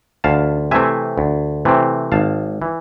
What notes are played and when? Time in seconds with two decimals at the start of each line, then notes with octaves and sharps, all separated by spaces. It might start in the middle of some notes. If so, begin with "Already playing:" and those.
0.24 D2 F5 A5
0.71 C3 E3 A3 C4 E5 G#5
1.18 D2
1.65 C3 E3 A3 C4
2.12 G#1 F5 A5
2.62 E3